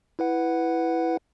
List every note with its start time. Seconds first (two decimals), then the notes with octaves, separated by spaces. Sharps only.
0.19 E4 B4 F#5